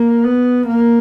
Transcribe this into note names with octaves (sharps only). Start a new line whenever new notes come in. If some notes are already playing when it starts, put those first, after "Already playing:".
Already playing: A#3
B3
A#3